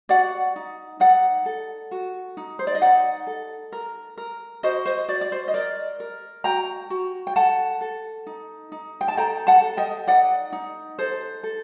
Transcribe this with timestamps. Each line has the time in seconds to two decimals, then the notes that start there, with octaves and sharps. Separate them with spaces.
0.09 F#4 D5 F#5
0.56 D#4
1.00 D#4 D5 F#5
1.46 A4
1.91 F#4
2.37 D#4
2.59 C5
2.67 D5
2.75 D#5
2.82 D#4 D5 F#5
3.27 A4
3.72 A#4
4.17 A#4
4.63 F#4 C5 D#5
4.85 C5 D#5
5.09 F#4 D5
5.21 D5
5.32 C5
5.48 D#5
5.54 A#4 D5
6.00 A#4
6.44 F#4 G5 A#5
6.90 F#4
7.27 G5
7.36 A4 F#5 A5
7.81 A4
8.27 D#4
8.72 D#4
9.01 G5
9.08 A5
9.17 A4 G5 A#5
9.47 F#5 A5
9.62 A4
9.77 D#5 G5
10.07 D#4 D5 F#5
10.53 D#4
10.99 A4 C5
11.43 A4